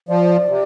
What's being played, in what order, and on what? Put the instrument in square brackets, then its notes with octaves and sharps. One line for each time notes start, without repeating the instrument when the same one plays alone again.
[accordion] F3 [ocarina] D5
[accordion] C3